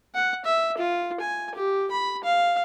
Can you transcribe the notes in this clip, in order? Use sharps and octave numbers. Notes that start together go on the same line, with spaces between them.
F#5
E5
F4
G#5
G4
B5
F5